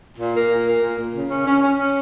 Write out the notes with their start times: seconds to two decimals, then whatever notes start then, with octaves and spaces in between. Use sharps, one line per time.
0.18 A#2
0.35 A#3
0.50 A#2
0.66 A#3
0.82 A#2
0.99 A#2
1.14 C#3
1.30 C#4
1.46 C#4
1.62 C#4
1.78 C#4